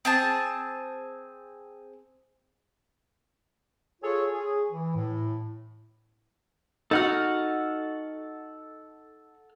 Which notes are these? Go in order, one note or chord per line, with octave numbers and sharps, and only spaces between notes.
C4 G#4 A5
F4 G#4 A4 C#5
G#4
E3
A2
D#4 F#4 A4 F#5 F6